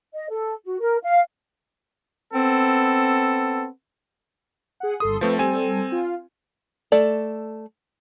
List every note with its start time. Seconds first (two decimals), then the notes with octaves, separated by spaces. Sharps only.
0.14 D#5
0.30 A4
0.65 F#4
0.80 A#4
1.03 F5
2.32 B3 C4 A4
4.80 G#4 F#5
5.00 G1 A4 C6 D#6
5.21 F3 A3 C4 B4 E5
5.39 G3 C4 A4 G#5
5.92 F4
6.92 A3 A4 D5